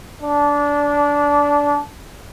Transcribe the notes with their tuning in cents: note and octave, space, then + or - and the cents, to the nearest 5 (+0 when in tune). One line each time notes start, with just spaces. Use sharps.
D4 -20